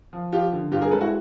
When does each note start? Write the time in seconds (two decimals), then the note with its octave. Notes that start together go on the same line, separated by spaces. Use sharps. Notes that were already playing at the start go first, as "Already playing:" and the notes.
0.13 F3
0.32 F3 F4 G4
0.52 D3
0.71 G2 F4 G4
0.81 G#4 A#4
0.91 G#3 A4 B4
1.01 E4 F#4